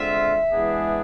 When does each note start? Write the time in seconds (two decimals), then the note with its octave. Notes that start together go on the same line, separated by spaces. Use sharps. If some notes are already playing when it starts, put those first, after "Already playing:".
Already playing: D3 G#3 C4 F4 E5
0.53 E3 G#3 B3 D4 G#4